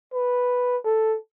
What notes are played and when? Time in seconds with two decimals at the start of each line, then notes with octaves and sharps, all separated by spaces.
0.13 B4
0.84 A4